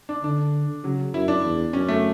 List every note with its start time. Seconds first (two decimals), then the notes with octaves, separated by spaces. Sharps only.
0.09 D4
0.23 D3 D4
0.83 C#3 F#3
1.14 F#2 E4
1.28 D4
1.44 E2
1.73 F#2 C#4
1.88 A3